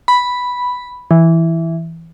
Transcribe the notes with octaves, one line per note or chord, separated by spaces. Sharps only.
B5
E3